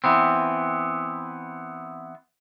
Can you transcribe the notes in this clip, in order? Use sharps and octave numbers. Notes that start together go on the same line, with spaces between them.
E3 B3 C4